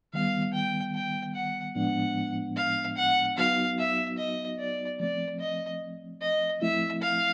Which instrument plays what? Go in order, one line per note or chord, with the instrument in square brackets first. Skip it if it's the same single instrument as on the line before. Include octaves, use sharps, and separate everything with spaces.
[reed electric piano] D#3 G3 B3 [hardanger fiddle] F5
[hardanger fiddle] G5
G5
F#5
[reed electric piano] A2 F3 G#3 B3 D4 [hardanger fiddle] F#5
[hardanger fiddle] F5
F#5
[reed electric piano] F#3 B3 D#4 F#4 [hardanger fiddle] F5
[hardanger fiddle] E5
D#5
D5
[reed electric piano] F3 A3 C4 [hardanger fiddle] D5
[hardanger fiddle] D#5
D#5
[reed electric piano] F3 A3 C4 E4 [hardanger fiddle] E5
[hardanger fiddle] F5